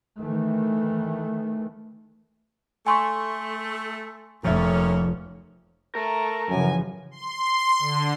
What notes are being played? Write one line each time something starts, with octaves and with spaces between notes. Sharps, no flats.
D#3 E3 A3
A3 G#5 C6 C#6
F1 A#2 F3 C#4 E5
A3 A#4 A#5
F#2 C#3 E3 F3 G#5
C6
D3